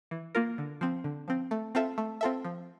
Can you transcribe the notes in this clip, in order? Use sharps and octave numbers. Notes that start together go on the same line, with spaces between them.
E3
A#3 F4 A#4
D3
F3 C4
D3
F3 C4
A3
C4 F4 A4 E5
A3
C4 F4 A4 E5
F3